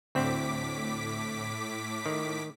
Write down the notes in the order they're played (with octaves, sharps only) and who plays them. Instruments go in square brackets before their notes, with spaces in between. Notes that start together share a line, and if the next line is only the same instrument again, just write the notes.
[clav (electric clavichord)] D2 C4 [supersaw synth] A2 D6 B6
[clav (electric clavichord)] D#3